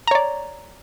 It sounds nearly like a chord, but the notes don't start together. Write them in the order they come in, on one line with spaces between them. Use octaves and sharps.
A#5 C#5 D5